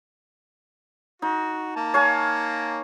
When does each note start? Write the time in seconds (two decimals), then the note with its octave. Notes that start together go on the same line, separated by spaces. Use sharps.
1.22 D#4 F#4
1.76 A#3 A5
1.94 C#5 F5 G#5